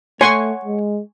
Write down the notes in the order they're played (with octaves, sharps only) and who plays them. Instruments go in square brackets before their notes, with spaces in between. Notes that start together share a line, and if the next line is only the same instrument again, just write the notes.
[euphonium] A3 [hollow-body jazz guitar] C#5 F#5 [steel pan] G#5 C6 C#6
[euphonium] G#3